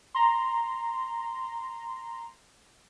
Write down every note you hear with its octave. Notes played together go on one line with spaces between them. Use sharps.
A#5 C6